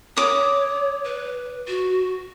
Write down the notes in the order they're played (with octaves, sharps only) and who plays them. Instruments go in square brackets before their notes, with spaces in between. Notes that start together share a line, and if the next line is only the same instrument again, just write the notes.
[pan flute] C#5 [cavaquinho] D6 D#6
[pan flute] B4
F#4